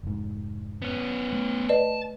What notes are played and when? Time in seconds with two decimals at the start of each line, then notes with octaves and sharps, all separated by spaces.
0.03 F1 G#2
0.82 B3 C#4
1.33 A3
1.69 B4 D5 D#5 A5